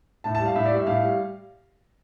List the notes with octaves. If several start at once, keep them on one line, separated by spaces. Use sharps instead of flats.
A2 A5
A5
G3
F5
A2 E5
D5
G3 E5
A2 F5
G3